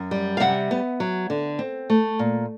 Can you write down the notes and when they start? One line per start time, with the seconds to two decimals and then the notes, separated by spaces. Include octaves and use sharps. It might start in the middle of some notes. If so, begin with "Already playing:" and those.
Already playing: F#2 F#5
0.11 G3
0.37 F5
0.40 C3 E5 F#5
0.71 B3
1.00 F#3
1.30 D3
1.59 C4
1.90 A3
2.19 A#2